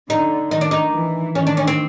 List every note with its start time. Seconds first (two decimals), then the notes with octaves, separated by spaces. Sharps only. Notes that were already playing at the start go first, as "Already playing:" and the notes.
0.10 D3 D#4
0.51 D#3 D#4
0.61 D4
0.71 D#4
0.94 E3
1.35 D#3 C#4
1.47 D4
1.57 C#4
1.67 C4